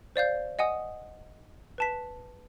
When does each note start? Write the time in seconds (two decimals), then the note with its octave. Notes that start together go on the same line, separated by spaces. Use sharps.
0.16 C5 D5 F5 G6
0.59 D#5 F#5 G#5 D#6
1.78 B4 A5 B6